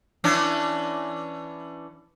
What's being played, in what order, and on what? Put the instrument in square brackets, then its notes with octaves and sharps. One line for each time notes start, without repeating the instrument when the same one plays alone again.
[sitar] E3 C#4 D4